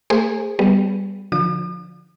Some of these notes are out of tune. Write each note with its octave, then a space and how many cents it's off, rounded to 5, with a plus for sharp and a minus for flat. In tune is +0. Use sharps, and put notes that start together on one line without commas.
A3 +35 G#4 -20 C5 +0
G3 +0 B3 +0 G#4 +0
D3 +0 F3 +20 D#6 -45